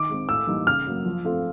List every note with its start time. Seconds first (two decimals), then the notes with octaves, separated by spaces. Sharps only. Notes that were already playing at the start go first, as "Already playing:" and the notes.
Already playing: D#3 D6
0.09 G#3 C4
0.28 A2 E6
0.47 E3 G3 A#3 D#4
0.67 C#3 F6
0.87 F#3 A#3
1.05 F3
1.25 A3 C4 F4 A4